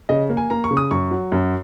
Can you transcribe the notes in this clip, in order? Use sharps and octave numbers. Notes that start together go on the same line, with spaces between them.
C#3 D#5
A#3
G#5
A#3 A#5
C#6
C#3
D#6
F#2 C#6
F#3
F#2